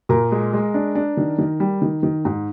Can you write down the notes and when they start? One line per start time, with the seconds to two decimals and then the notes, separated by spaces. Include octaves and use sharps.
0.09 A#2 A#4
0.32 G#3
0.53 G#3
0.74 D4
0.95 D4
1.17 D#3
1.38 D#3
1.60 G3
1.82 D#3
2.03 D#3
2.25 G#2